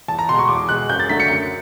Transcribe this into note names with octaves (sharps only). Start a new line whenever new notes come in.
E2 A5
A#5
B2 G#3 C6
C#6
E2 D6
B2 G#3 F#6
F#2 G6
A6
D3 F#3 A3 B6
C#7
F#2